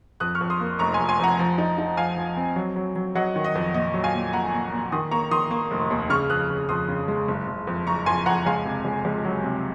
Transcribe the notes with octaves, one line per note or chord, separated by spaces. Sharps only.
F2 D#6 F#6
C#6 F6
F2
C6 D#6
A#3
F1 A#5 C#6
G#5 C6
F1
G#5 C6
F2 F#5 A#5
F3
D#4
D#4
F3 F5 G#5
F3
C4
F#3
F#3
F#3
F#3 D#5 F#5
D#3
D#5
F2
A#2 D#5
F#3
F5 G#5
A#2
A#2 F#5 A#5
A#2
A#2
D#3 C6 D#6
A#3 A#5 C#6
D#3 C6 D#6
A#3
F1
D#2
C#3 C#6 F6
F2 D#6 F#6
C#3
F2 C6 D#6
C#3
G#3
F#1
F#1
F2
F#1 A#5 C#6
F2 G#5 C6
F2 F#5 A#5
C#2 F5 G#5
C3
C#2
C#2
F#3
C3